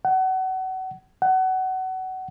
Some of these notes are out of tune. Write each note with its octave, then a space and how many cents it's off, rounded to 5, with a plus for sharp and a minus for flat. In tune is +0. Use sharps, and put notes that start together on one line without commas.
F#5 +30
F#5 +25